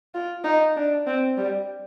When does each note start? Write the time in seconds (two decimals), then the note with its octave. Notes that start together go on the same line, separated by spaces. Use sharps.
0.14 F4
0.44 D#4
0.76 D4
1.06 C4
1.37 G3